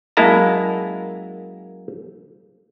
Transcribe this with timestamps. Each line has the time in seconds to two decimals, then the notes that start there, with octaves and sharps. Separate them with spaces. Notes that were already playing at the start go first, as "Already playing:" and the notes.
0.17 F#2 G#3 A#3 E4 A5 A#5